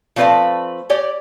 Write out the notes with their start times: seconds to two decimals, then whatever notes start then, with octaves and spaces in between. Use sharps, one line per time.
0.16 F3 A3 C4 B4 D5 F5
0.90 G4 C#5 D5